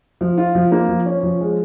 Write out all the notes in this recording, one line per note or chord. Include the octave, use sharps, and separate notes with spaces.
F3
F4
F3
A#3
F3
C#4
F3
G#3